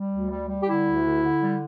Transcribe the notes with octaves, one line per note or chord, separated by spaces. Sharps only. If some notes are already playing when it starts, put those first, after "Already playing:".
Already playing: G3
D2
G3
G3
G4
D3 E4
D2
D3
D3
G3